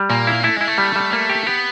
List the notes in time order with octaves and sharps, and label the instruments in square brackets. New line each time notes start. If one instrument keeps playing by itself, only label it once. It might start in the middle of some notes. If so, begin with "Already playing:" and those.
Already playing: [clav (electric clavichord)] G3
[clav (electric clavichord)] A#2 [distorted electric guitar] A#3
[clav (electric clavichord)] E4
[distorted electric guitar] A3 [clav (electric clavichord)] E4
[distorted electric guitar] G#3 [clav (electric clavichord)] E4
[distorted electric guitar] A3
[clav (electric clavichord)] G3
G3
[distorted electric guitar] A3 [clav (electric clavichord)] A#3
[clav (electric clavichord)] G4
[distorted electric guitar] B3 [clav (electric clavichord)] G4